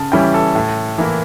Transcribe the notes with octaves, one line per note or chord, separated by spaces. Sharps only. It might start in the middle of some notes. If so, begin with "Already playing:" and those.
Already playing: C#3 A5
E3 G3 C#4 E4 G5
A4
A2
E3 A#3 E4